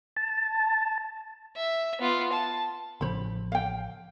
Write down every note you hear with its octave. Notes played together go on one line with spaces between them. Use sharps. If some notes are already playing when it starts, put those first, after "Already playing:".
A5
E5
B3 F4
A5
A1 C#3 F3 C5 B5
F5 G5